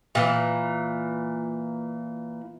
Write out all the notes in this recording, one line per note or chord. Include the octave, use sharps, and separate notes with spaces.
A#2 E3